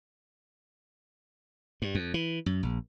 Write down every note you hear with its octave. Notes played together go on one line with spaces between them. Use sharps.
G2
F2
E3
F#2
A#1